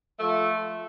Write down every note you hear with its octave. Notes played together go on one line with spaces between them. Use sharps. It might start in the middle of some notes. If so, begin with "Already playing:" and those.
F3 A3